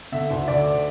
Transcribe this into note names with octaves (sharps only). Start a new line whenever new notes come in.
D3 E5
D2
D2 D5